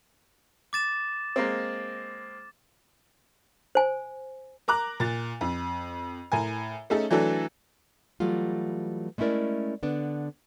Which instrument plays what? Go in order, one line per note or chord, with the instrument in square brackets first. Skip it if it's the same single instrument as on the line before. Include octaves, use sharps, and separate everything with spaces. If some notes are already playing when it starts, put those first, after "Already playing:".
[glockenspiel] D6 A6 E7
[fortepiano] G#3 A#3 C4
[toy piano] C5 G#5
[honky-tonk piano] A#4 A#5 D6 F#6
A#2 A6
F2
A2 A#4 G#5
A3 C#4 D#4 G#4 A4
E3 F#3 A3 D4 A4
[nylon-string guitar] E3 F#3 G3 A3 F4
G#3 A3 C#4 E4 A#4 D5
D3 B3 D4